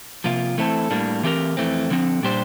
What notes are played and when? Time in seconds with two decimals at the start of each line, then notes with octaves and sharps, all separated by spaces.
0.24 C3 F3 A#3 F4
0.58 E3 A3 C4 E4 A4
0.91 A2 G3 A#3 D4
1.23 E3 A3 C4 G4 A#4
1.57 F2 E3 A3 C4
1.90 D3 F3 C4
2.23 A#2 G3 D4 G4 C5